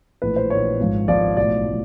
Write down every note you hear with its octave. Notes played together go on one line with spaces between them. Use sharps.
A#1 A2 E3 B4
C5
A#1 A2 E3 C#5
G#1 G#2 F3
G#1 G#2 F3 D5
B1 A2 F3 D5
A2 F3